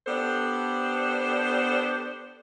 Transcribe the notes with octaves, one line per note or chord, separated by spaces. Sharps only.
B3 D4 G4 A4 C5